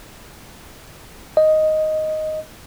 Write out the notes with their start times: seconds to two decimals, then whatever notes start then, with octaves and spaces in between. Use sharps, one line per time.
1.37 D#5